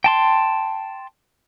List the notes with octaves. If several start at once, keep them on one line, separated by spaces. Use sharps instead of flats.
G5 A5 C6